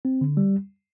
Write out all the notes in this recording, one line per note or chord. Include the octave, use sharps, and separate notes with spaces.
C4
D3
G3